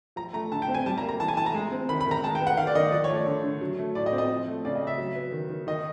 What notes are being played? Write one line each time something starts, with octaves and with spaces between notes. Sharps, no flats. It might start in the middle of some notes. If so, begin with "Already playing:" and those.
F3 A#5
A3 A#5
D3 A5
G5
C4
G#5
G3 A5
A#5
A#3
A#5
E3 A5
G#5
E3 A5
A#5
G#3
C4
D#3 B5
B5
D#3 A#5
G#3 A5
G5
B3
F#5
D#3 F5
D5
D#3 D#5
F3 D5
C#5
A3
D5
D3
D3
F#3
A3
A2 D5
D#5
C4
D#5
F3
A3
C#3 D5
D#5
C#3
E5
F#3
B3
D#3
D#3
D#3 D#5